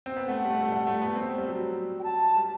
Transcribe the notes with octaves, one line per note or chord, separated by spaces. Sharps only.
C4
B3
A3 F#5
G3
A3
A3
G3
A3
B3
C4
G3
F#3
G5
A5
G3